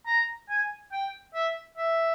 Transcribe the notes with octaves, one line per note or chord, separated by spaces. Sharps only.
A#5
G#5
G5
E5
E5